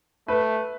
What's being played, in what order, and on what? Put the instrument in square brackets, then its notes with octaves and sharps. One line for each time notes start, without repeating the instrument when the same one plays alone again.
[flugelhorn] A3 [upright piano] B4